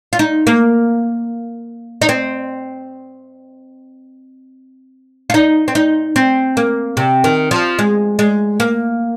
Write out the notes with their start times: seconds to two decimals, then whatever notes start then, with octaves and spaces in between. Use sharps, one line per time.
0.13 F4
0.19 D#4
0.47 A#3
2.02 D#4
2.09 C4
5.30 F4
5.34 D#4
5.68 C4
5.75 D#4
6.16 C4
6.57 A#3
6.97 C3
7.24 D#3
7.51 F3
7.79 G#3
8.19 G#3
8.60 A#3